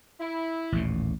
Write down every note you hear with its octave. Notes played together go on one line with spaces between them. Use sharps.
E4
A1 D#2 A#2